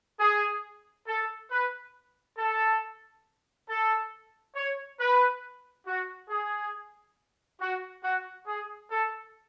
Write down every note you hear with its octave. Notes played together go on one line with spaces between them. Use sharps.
G#4
A4
B4
A4
A4
C#5
B4
F#4
G#4
F#4
F#4
G#4
A4